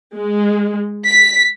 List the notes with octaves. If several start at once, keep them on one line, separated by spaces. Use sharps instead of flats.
G#3
B6